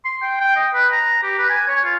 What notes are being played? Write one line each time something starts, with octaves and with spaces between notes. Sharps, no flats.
C6
G5
G5
D#5
B4
A#5
G4
B4
G#5
C#5
F4